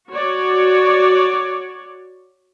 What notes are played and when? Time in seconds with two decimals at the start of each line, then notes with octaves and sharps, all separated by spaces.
0.12 F#4 C#5 D5